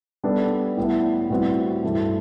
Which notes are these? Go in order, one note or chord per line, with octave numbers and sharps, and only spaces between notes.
G3 B3 D4 A4
A2 G3 B3 E4
A2 G3 C4 F#4 B4
G2 E3 A3